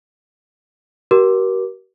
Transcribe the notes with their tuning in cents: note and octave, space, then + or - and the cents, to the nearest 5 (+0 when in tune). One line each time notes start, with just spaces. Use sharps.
G4 -45 A#4 +30 D6 +0